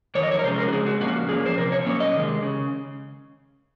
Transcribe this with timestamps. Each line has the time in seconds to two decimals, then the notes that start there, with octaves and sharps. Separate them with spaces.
0.15 F2 D#3 F#3 C#5
0.23 D#5
0.31 C#5
0.39 A#4
0.43 C3 F3 G#3 C#4 C5
0.58 A#4
0.68 F#4
0.72 C#3 G#3 C4 G#4
0.86 F#4
1.00 A#2 F3 A#3 C#4 F#4
1.29 A#2 F3 A#3 C#4 G#4
1.46 C5
1.58 C3 F3 C4 A#4
1.72 C#5
1.86 A#2 F#3 A#3 C#4 C#5
2.00 D#5
2.14 C3 D#3 G#3
2.43 C#3